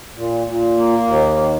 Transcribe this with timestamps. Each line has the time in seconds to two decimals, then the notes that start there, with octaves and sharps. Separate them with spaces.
0.17 A#2
0.47 A#2
0.77 A#3
1.07 D#2
1.37 D#3